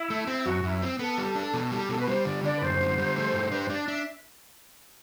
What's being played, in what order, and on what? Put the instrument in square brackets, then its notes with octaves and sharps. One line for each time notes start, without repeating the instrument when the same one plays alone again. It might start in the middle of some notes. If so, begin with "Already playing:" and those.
Already playing: [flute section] E4
[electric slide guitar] A3
C4
[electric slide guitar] F#2 [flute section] F#4
[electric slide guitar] F#2 [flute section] E4
[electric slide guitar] C4
[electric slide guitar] B3 [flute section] A4
[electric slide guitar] G3
D4
B2
G3
[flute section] G4
[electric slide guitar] B2 [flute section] A4
[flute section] B4
[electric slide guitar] G3 [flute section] C5
[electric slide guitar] D3 [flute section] D5
[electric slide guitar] D3 [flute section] D5
[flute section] B4
[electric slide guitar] F#2 [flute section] C5
[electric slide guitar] D3
G3
A3
G2
[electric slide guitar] D4 [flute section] B4
[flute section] C5
[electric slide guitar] D4 [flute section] D5
[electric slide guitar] D4 [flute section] E5